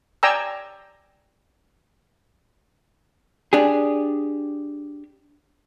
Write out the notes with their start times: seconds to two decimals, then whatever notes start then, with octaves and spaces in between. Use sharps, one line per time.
0.23 D5 G5 G#5 A#5 E6
3.53 D4 G4 G#4